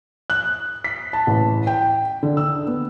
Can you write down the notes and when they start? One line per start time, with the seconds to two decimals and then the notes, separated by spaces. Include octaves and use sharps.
0.30 F#6
0.84 B6
1.13 A5
1.27 A1
1.67 G5
2.23 D3
2.37 E6
2.67 B3